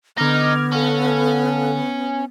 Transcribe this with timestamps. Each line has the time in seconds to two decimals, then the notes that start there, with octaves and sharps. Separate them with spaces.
0.18 D3 B3 D#4 D6 F6 G#6 A#6
0.72 C#4 A4 F5 F#5